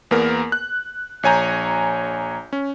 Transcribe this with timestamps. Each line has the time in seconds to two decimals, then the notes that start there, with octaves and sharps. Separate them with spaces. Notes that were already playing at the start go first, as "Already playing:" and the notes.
0.11 E2 A#3 B3 A#4
0.52 F#6
1.23 A#1 C#5 G#5 A#5 G6
2.53 C#4